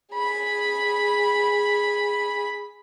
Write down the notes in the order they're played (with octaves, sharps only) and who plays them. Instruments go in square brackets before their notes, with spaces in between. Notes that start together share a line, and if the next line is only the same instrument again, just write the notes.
[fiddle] G#4 B5